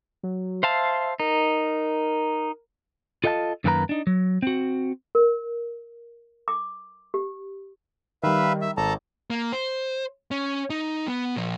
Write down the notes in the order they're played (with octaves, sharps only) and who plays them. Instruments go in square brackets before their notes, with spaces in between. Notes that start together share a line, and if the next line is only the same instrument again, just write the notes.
[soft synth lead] F#3
[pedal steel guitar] C5 F5 A5 [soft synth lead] E5
[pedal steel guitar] D#4 [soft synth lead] A#4
[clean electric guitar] F4 A4 D#5 F5 F#5 A5
F#2 D#3 A#3 A4 B4 A#5
D4 D#4
F#3
C4 F#4
[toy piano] A#4
D6
G4
[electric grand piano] D#3 G3 [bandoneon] B4 E5 F5
[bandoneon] E5
[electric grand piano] G#1 [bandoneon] A4 A5 A#5
[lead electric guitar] A#3
C5
C#4
D#4
B3
A#2 F3